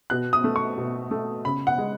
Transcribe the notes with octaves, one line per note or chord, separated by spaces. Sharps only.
B2 F#6
D#6
A3
C#6
B2
A3
C#3 B5
F#5
G#3